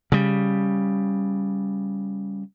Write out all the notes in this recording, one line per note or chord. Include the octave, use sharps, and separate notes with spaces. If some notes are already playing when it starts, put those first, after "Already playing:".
C#3 G3